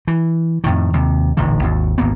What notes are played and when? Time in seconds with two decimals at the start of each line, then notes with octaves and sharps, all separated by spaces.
0.07 E3
0.64 F2 A2 D#3
0.93 D#2 C3
1.37 D#1 A1 D3 D#3
1.63 G#1 D#2
1.98 G#1 D2 A#3 B3